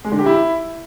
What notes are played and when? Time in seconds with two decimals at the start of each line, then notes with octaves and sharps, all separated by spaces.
0.04 G#3
0.12 D3
0.19 G4
0.26 E4